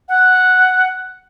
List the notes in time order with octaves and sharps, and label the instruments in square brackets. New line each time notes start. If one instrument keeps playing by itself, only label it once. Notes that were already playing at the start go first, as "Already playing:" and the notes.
[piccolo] F#5